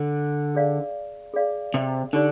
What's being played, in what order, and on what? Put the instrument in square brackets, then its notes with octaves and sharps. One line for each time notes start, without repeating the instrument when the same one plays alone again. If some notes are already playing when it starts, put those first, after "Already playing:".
Already playing: [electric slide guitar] D3
[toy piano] G#4 D5 F5
G#4 D5 F5
[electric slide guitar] C3
[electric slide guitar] D3 [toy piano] D#4 G4 D5